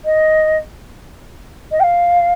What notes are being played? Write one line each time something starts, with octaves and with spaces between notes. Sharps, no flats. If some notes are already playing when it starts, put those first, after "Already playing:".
D#5
D#5
G5
F5